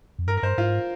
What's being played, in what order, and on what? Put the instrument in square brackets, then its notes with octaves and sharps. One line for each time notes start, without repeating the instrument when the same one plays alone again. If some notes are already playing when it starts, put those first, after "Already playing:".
[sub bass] F2
[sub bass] G2 [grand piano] A#4
[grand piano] A#4
[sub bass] G2 [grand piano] C5
[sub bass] G#2 [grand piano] F4